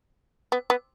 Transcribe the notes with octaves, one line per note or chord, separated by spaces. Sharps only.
B3
B3